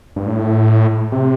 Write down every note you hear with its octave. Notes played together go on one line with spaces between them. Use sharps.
G2
A2
C3